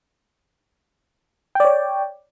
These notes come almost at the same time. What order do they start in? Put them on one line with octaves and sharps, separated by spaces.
G5 D5 C#5